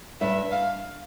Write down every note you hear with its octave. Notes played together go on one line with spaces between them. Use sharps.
G2 E5
F5